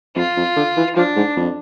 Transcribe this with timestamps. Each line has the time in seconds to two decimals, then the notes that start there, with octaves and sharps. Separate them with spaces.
0.16 F2 F4
0.36 F2
0.56 D3
0.77 E3
0.96 F3 D4
1.16 G#2
1.36 F2